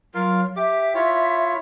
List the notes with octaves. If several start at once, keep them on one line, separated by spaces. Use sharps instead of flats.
F#3 F4 A#4 F5
G4 E5 D6
E4 F4 C#5